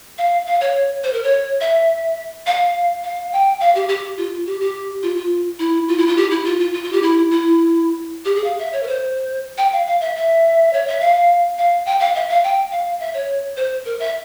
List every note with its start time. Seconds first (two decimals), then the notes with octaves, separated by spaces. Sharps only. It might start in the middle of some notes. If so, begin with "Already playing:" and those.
0.18 F5
0.46 F5
0.61 C#5
1.03 C5
1.13 A#4
1.23 C#5
1.60 E5
2.46 F5
3.03 F5
3.32 G5
3.60 F5
3.75 G4
3.88 G4
4.17 F4
4.46 G4
4.60 G4
5.03 F4
5.16 F4
5.59 E4
5.88 F4
5.98 E4
6.07 F4
6.17 G4
6.30 E4
6.45 F4
6.60 F4
6.73 F4
6.84 F4
6.92 G4
7.02 E4
7.31 E4
8.25 G4
8.35 G#4
8.44 F5
8.59 E5
8.73 C#5
8.83 A#4
8.87 C5
9.58 G5
9.72 F5
9.86 F5
10.00 E5
10.16 E5
10.73 C#5
10.87 E5
11.00 F5
11.58 F5
11.86 G5
12.00 F5
12.15 E5
12.29 F5
12.44 G5
12.71 F5
13.00 E5
13.14 C#5
13.57 C5
13.85 A#4
13.99 E5